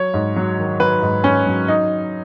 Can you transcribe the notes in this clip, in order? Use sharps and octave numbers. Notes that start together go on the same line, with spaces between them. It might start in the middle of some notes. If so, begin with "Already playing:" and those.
Already playing: F#3 C#5
G#2
F#3
D#3
F#3 B4
G#2
G#2 C#4
F#3
D#4